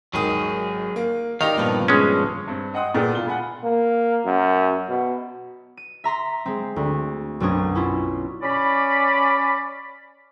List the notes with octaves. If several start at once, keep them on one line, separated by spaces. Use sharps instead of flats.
G#1 D#3 F#3 G#4 D#6
A#3
D#3 D#4 G4 D5 F5 A#5
G2 A#2 F3 B3 D4
G#3 C#4
G2 C4
D#5 F#5 G5 C6 D#6
A#2 B3 G#4 A4 D5 G5
E1 F4 G7
F#5 G#5 B5
A#3
F#2
B2
D#7
E5 A#5 C6 B6
G#3 C4
D2
B1 F#2 C4 D4 C#5 D#6
C#4 E4 F4
C#4 D5 B5